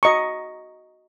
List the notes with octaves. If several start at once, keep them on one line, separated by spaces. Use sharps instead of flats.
F#4 D#5 A#5 C#6